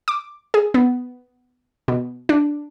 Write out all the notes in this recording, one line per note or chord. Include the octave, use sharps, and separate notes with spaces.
D6
G#4
B3
B2
D4